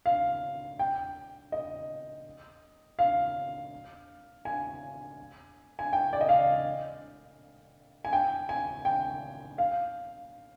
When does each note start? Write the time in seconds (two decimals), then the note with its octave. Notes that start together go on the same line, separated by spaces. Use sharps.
0.06 F5
0.79 G5
1.52 D#5
2.99 F5
4.45 G#5
5.79 G#5
5.93 G5
6.13 D5
6.21 D#5
6.29 F5
8.05 G#5
8.13 G5
8.49 G#5
8.85 G5
9.58 F5